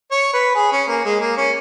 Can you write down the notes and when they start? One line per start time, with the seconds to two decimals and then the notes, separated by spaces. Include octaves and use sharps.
0.11 C#5
0.33 B4
0.56 G#4
0.72 C#4
0.88 A#3
1.05 G#3
1.20 A#3
1.37 C#4